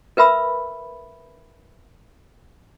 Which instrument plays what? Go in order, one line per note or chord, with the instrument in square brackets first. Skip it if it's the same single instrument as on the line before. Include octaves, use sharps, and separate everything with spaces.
[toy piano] A#4 B4 E5 B5 E6